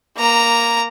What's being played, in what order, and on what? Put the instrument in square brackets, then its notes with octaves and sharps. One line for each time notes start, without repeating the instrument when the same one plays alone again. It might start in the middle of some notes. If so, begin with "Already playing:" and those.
[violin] A#3 A#5